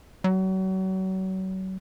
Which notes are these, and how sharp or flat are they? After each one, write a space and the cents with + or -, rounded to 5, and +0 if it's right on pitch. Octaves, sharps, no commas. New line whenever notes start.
F#3 +35